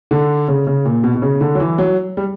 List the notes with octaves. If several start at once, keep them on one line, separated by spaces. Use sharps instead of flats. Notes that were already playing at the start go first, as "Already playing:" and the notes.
D3
C#3
C#3
A#2
B2
B2
C#3
D3
F#3
E3
F#3
G3